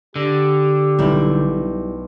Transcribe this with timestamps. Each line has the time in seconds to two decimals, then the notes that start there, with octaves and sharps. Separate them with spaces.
0.16 D3 G4 A#6
0.99 B1 G3 E4 A#5 G6